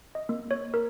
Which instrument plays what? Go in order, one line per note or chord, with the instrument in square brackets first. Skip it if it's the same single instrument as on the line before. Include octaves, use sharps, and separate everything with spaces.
[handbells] D#5
A#3
C#5
A#4